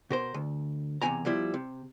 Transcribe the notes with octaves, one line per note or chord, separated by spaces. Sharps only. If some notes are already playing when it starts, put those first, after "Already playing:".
B2 A#4 C5
D2
E2 C3 B3 E4 G#5 A#5
B2 F3 G3 E4
C3